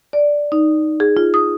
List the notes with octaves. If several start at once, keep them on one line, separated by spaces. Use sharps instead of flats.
D5
D#4
G#4
F4
D#6